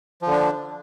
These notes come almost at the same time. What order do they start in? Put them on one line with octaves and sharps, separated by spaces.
F3 D3 D4